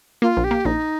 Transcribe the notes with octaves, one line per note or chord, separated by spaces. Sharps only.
A#3 F4
A#1
G4
A#3
A#1 D#4